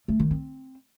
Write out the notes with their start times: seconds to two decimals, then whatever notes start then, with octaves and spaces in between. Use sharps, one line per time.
0.08 A3
0.20 D#3
0.31 C4